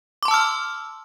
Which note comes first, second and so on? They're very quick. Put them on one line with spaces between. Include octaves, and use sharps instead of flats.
D6 C6 A5 E6 F6